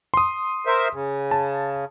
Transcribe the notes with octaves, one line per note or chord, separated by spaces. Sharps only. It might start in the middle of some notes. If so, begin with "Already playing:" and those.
C6 D#6
A#4 C5 E5
C#3
A5